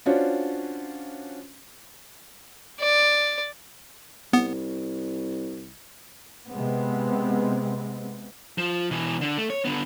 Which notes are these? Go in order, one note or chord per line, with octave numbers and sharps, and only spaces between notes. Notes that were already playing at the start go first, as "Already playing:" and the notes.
C#4 D4 F4 F#4 C5 C#5
D5
C2 B3
C3 G#3 B3 C4
F3
B2 E3
D3
A3
C#5
D3 B3